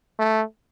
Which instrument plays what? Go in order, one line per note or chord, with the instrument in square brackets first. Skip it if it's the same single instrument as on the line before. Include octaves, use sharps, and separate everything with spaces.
[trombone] A3